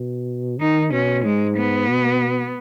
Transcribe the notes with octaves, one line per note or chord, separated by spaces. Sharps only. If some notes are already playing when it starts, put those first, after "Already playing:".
Already playing: B2
D#3 D#4
B2 C#4
G#2 G#3
B3
B2